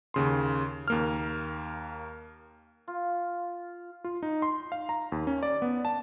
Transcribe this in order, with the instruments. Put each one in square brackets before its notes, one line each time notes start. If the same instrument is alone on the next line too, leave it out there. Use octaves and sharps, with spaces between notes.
[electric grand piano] D#2 C#3 C6
D#2 A#3 F6
[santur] F4
[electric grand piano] F4
D#4
C6
F5
A#5
D#2
C#4
D5
B3
A5